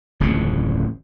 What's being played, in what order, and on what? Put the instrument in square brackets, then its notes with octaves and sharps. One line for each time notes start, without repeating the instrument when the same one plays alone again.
[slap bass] D1 A1 F2 C#3